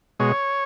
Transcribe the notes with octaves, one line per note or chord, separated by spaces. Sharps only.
B2 G#3 C#5